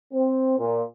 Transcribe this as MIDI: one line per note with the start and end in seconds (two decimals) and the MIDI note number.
0.12 0.57 60
0.58 0.82 46